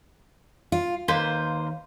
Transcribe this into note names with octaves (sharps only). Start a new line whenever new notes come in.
F4
D#2 A#3 B4 C5